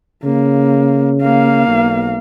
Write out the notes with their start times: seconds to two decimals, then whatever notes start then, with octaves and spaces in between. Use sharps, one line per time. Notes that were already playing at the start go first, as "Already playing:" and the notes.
0.24 C#3 A#3
1.21 A#3 F5
1.67 B1